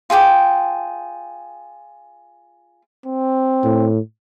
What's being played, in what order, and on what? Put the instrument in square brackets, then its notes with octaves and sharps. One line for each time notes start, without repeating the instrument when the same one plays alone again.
[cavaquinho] F4 G#4 G5 D6
[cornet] C4
[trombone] A2